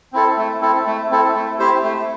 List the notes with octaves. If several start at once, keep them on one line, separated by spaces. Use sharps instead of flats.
C4 E4 A4
A3
C4 E4 A4
A3
C4 E4 A4
A3
C4 E4 G4 C5
A3